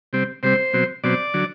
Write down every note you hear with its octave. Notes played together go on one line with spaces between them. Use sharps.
C3 G3 C4
C3 G3 C4 C5
B2 F#3 C4
B2 F#3 C4 D5
D3 F#3